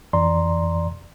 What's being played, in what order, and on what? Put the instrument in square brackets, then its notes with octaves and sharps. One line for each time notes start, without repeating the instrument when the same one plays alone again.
[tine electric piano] F2 E3 D5 A#5 C6